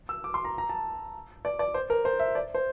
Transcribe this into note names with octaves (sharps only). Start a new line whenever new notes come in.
E6
D6
C6
A#5
A#5
A5
D5
D5
C5
A#4
C5
E5
D5
C5